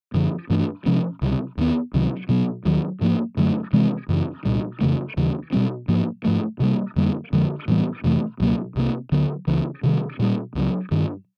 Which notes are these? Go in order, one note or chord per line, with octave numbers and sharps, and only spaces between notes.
F#2 D3 F3
G2 E3 A3 D4
C3 F3 G#3 C#4
C#2 C3 D#3 G3
D#2 D#3 G#3 B3
C#2 C3 D#3 F#3
B2 F#3 B3
D#2 D#3 F#3
G#2 F3 A#3
F#2 D3 F#3 A3
C3 E3 G#3 C4
F#2 C#3 E3
C2 A#2 G3
F2 C#3 E3 A3
D#2 C#3 E3 G3
B2 G3 C4
G#2 F3 A#3
G#2 F3 A3
C3 E3 G3 A#3
F2 D3 G3 A#3
F2 D3 F3 G#3
A2 E3 G3 B3
F2 C3 E3 A3
C#2 B2 F#3 A#3
C2 C3 F3 A#3
D2 D3 F#3 B3
C#2 C#3 E3
C3 D#3 G3
A#2 G3 A#3
C#2 C#3 F#3
G2 D#3 G3